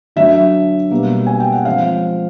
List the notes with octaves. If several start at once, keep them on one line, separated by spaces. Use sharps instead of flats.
D3 F#3 A3 E5
B2 G3 A#3
G#5
G5
F#5
F3 G#3 C4 F5